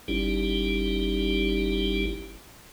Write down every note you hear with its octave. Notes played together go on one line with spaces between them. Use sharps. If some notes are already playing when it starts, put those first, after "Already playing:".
G1 G3 C#4 D#4 E4 G4